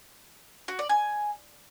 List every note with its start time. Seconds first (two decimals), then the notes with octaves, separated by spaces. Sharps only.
0.68 F#4
0.79 D5
0.89 G#5